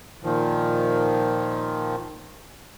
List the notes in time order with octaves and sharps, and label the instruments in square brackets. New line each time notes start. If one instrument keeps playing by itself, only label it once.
[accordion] A#2 D#3 F3